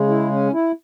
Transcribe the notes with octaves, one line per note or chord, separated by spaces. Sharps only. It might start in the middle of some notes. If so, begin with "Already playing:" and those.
Already playing: C#3 G#3
E4
C#4
E4